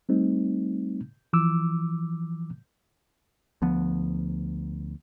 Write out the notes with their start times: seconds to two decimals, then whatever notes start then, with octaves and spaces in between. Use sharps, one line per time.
0.09 G3 A3 C4 D#4
1.33 E3 F3 D6 E6
3.62 D2 F3 B3